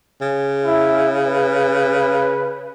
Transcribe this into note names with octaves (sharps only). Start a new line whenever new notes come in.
C#3
E4
B4